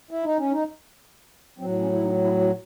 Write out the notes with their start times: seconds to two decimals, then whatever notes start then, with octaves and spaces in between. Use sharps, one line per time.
0.11 E4
0.24 D#4
0.38 C#4
0.51 D#4
1.59 A2 F#3 C4
1.80 C#4
1.93 E4
2.03 D#4
2.24 E4
2.41 F#4